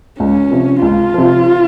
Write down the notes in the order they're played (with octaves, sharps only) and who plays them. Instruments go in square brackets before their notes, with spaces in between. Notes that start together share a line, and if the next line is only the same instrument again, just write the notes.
[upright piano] C#2 [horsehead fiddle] C#4
[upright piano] C3 F3
[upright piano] C#2 [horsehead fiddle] F4
[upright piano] C3 F3